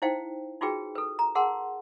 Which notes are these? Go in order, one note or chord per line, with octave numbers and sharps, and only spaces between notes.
D#4 E4 C5 F5 G5
D#4 F4 F#4 G#4 B4 G5
A4 B4
A#5
G#4 A#4 F#5 A5 C6